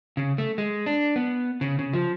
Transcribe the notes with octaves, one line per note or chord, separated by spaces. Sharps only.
C#3
A3
G#3
D4
B3
C#3
C#3
F3